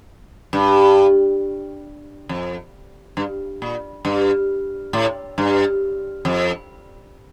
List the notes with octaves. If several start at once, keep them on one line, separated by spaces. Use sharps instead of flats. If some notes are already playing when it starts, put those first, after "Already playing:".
G2
F2
G2
A#2
G2
A2
G2
F2